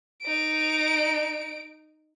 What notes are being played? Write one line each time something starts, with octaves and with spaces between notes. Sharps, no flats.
D#4 D7